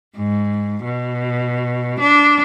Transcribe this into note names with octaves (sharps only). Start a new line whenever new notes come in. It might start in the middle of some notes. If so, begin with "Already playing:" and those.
G#2
B2
D4